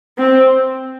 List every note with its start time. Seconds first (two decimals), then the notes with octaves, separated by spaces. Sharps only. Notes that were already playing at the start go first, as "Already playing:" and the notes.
0.18 C4